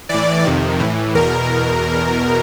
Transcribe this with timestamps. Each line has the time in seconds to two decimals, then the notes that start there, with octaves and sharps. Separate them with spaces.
0.09 A2 E3 D5
0.45 F2 C3 D#3
0.79 A2 E3
1.15 E2 B2 A#4